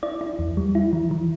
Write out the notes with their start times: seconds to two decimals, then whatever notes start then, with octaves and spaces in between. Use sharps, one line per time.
0.03 E4 D5
0.21 E4
0.39 E2
0.57 G3
0.75 E4
0.93 E3
1.11 E3